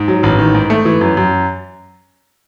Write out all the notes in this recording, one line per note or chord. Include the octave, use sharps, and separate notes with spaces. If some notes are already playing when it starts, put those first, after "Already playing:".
Already playing: G#2
F#3
A1
D#3
G#2
A3
E3
F#2
F#2